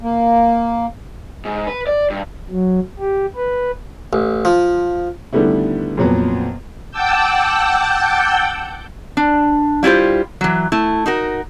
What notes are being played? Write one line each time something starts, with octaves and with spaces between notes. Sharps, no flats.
A#3
G#2
B4
D5
G2
F#3
G4
B4
A1
F3
D3 D#3 G3 A3 B3 E4
F2 A#2 F#3 B3
F#5 G5 A5 D6 E6 G6
D4
G3 E4 F4 G4 C5
E3 F#3
A3 E4
D#4 F#4 A#4